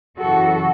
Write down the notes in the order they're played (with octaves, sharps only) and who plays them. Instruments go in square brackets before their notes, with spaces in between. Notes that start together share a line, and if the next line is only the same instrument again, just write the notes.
[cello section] F#2 C#3 E3 F#4 A4